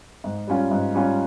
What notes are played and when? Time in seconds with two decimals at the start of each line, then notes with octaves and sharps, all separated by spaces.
0.24 G#2
0.47 G3 C#4 F4
0.71 G#2
0.94 G3 C#4 F4